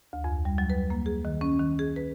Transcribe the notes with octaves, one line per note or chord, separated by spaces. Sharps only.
D2
F2
G3
F#3
B4
A#3
G#4
D#3
C#4
D#3
G#4
B4